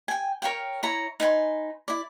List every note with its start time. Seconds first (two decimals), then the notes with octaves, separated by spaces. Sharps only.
0.08 G5 G#5
0.42 A#4 C#5 F5 G5
0.83 E4 C#5 A#5
1.20 D#4 B4 G#5 C6
1.88 E4 D5